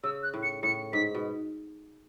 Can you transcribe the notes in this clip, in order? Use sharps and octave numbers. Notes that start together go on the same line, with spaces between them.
C#3 E6
F#6
A2
C#7
A2 C#7
G#2 B6
B2